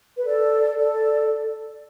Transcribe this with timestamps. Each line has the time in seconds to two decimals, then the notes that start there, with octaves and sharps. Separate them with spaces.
0.17 B4
0.25 A4 D5
0.77 A4 D5